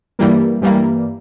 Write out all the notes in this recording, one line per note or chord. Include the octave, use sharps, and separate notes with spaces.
G2 E3 G3 A#3
G2 E3 G3 A#3